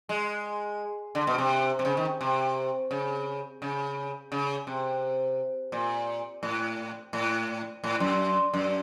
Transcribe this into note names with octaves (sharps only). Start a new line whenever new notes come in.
G#3
D3
B2
C3
C3
C#3
D#3
C3
C#3
C#3
C#3
C3
A#2
A2
A2
A2
F#2
F#2